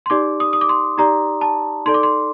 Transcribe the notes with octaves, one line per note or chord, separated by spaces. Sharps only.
C6
D#4 G4 D5 D6
D#6
D#6
D6
C6
D#4 G4 D5 A#5
A5
D#4 A4 D5 C6
D6
C6